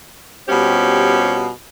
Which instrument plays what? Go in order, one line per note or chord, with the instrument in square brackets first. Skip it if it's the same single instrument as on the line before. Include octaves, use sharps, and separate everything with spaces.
[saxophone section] B2 G3 C4 C#4 F4 G4